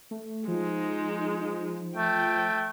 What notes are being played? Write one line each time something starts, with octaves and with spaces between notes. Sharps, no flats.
A3
F3 G#3 D#4
A3 G5